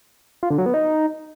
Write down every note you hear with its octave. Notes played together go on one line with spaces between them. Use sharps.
F4
D3
F#3
B3
D#4